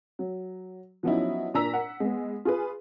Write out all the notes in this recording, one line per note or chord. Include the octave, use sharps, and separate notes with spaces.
F#3
F3 F#3 B3 C#4 D#4 E4
A#2 D4 A#4 A#5 E6 B6
F#5
G#3 B3
F4 G#4 B4